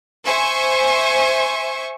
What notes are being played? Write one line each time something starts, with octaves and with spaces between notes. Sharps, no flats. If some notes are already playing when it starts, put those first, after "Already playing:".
C5 E5 G#5 C#6